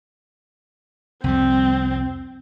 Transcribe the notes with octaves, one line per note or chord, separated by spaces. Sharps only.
C2 F2 G3 C4